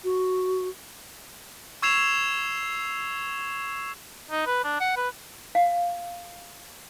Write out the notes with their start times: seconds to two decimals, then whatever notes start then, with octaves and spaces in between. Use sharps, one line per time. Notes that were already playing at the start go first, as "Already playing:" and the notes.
0.04 F#4
1.82 C#6 E6 G#6 C7 E7 F7
4.31 D#4
4.47 B4
4.64 D4
4.80 F#5
4.97 B4
5.55 F5